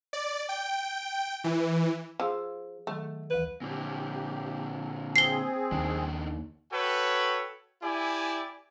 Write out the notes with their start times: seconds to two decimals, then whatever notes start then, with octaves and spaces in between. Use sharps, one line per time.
0.13 D5
0.49 G5
1.44 E3
2.20 F3 G#4 F5 E6
2.87 D#3 F#3 A3
3.30 D2 E3 B4
3.61 A#2 D3 G4
5.16 C4 G#4 C7 G7
5.72 D#2 D#3 D4
6.72 F#4 A4 B4 C#5 G5
7.82 E4 G4 D5 G#5